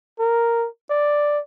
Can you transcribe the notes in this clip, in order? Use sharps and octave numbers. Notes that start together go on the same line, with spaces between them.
A#4
D5